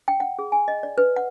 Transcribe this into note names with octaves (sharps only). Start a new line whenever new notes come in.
G5
F#5
G#4
G#5
D#5
D5
B4
F#5